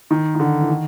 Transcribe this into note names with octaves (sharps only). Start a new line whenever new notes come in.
D#3
D#3
D3
E3
D#3